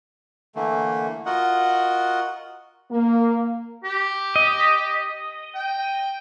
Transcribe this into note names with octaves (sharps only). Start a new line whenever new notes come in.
D3 E3 A3 A#3
F4 F#4 A#4 D#5 F#5
A#3
G4
D#5
G5